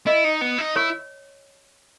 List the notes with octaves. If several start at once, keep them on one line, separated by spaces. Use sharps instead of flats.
E4 D#5
D#4
B3
D#4
E4 C#5